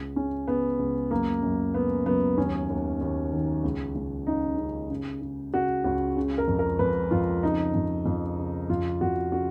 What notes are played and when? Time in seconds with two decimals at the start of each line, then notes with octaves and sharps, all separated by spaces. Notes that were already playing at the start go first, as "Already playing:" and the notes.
Already playing: C#2
0.16 C#3 C#4
0.48 C#3 B3
0.79 C#2
1.11 F#2 A#3
1.42 F#2
1.74 C#3 B3
2.06 F#2 B3
2.37 D#2 C#4
2.70 D#2
3.01 D#2
3.33 D#3
3.63 C#2
3.95 C#2
4.27 C#3 D#4
4.58 C#3
4.90 C#3
5.21 C#3
5.53 C#3 F#4
5.84 C#2 F#4
6.17 C#3
6.38 A#4
6.48 F2
6.59 A#4
6.79 F2 B4
7.11 F2 F4
7.43 C#3 D#4
7.74 F2
8.06 F2
8.38 C#3
8.70 F2 F4
9.01 F2 F#4
9.32 C#3 F#4